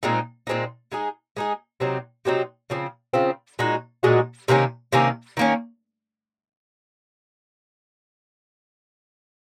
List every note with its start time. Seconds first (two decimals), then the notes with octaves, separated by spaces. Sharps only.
0.03 A#2 G#3 C4 D#4
0.47 A#2 G#3 C4 D#4
0.92 G#3 D#4 G#4
1.37 G#3 D#4 G#4
1.80 C3 F#3 C4 D#4
2.25 C3 F#3 C4 D#4
2.70 C#3 F3 C4
3.14 C#3 F3 C4
3.59 A#2 G#3 D#4 F#4
4.03 A#2 G#3 D#4 F#4
4.48 C3 D#3 A#3 C#4
4.93 C3 D#3 A#3 C#4
5.37 D#3 A#3 C#4